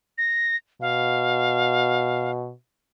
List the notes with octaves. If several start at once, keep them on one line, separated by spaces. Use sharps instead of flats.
A#6
B2 F5